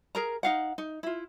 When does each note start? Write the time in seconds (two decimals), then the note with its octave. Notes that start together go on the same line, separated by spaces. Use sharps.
0.15 G#4 A#4 A#5
0.43 D#4 F5 F#5
0.78 D#4
1.03 E4 F4